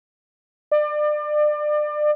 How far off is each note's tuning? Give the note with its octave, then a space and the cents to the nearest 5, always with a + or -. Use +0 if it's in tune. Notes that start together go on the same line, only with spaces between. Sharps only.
D5 +30